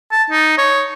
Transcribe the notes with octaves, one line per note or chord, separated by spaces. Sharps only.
A5
D#4
C#5